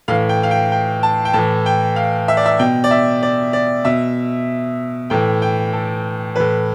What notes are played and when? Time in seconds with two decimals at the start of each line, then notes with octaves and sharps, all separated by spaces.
0.08 A2 E3 F5
0.29 G5
0.43 F5
0.51 G5
0.72 G5
1.03 A5
1.25 G5
1.33 A2 E3 A5
1.66 G5
1.96 F5
2.28 E5
2.37 D5
2.46 E5
2.59 B2 G5
2.84 D5
2.91 E5
3.23 D5
3.53 D5
3.85 B2 E5
5.10 A2 E3 G5
5.42 G5
5.73 A4
6.36 A2 E3 B4